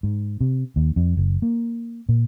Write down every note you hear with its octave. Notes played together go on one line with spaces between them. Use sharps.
G#2
C3
D#2
F2
F#1
A#3
A#2